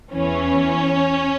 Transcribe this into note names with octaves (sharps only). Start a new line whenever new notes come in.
E2 E3 C#4